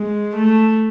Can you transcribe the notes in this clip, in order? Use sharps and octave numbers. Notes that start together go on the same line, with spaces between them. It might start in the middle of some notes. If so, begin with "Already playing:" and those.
Already playing: G#3
A3